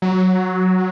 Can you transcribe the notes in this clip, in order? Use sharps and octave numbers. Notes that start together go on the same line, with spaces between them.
F#3